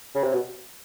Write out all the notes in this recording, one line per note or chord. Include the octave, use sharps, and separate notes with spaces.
C#3
C3
B2